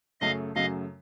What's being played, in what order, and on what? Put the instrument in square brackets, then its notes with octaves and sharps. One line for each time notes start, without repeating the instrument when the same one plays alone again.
[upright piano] F#2 C#3 F#3 A3 [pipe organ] D#5 F5
[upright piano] F#2 C#3 F#3 A3 [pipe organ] D#5 F5